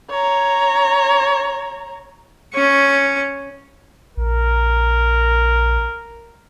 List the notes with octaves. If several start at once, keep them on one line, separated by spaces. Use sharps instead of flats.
C#5 A#5
C#4 C#6
A#1 A#4